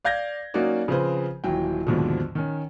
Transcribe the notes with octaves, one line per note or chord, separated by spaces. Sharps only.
D5 F5 G6 G#6 A#6
F#3 A#3 C#4 D#4 F#4 D5
C#3 F3 C4 G#4 B4 C5
D#1 E3 F#3 G5
D#2 G#2 B2 D3 F3
D#3 C#4